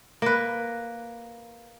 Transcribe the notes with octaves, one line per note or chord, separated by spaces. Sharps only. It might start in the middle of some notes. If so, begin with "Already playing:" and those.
A#3 B4